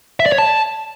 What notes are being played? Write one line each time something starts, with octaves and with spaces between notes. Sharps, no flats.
E5
D5
C#5
A5